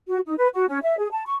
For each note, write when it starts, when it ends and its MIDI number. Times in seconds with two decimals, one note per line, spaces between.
0.08 0.20 66
0.26 0.34 63
0.38 0.48 71
0.53 0.66 66
0.68 0.79 61
0.82 0.97 76
0.98 1.07 68
1.12 1.23 81
1.26 1.34 85